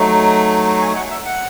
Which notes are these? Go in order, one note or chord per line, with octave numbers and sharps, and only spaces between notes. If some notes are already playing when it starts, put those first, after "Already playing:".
Already playing: F#3 A3 D#4
G#5
F#5
E5
F#5